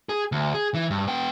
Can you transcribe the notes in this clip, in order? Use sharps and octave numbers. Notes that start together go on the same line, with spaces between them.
G#4
D2
G#4
E3
G2
B3 G5